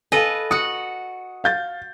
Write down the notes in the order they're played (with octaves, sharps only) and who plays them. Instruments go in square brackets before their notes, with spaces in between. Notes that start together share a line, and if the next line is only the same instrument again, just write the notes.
[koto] A4 B4 D#5 [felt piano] F5 G#5
[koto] F#4 F#5 [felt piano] D#6 C#7
[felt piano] F5 G6 A6